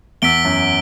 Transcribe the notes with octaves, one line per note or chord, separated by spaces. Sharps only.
E2 E6 B6 D7 G7
F#2